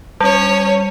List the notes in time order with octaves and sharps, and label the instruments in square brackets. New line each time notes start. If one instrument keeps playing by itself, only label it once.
[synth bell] G3 [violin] C#4 C#5